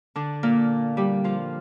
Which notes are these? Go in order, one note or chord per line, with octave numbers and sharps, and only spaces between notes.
D3 D4
A#2 A#3
G3 G4
F3 F4